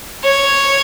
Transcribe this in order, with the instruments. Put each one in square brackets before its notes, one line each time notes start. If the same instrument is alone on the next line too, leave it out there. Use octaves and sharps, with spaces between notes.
[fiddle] C#5